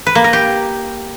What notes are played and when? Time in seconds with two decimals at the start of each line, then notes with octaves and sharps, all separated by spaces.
0.07 B4
0.15 A#3
0.24 A#4
0.33 G4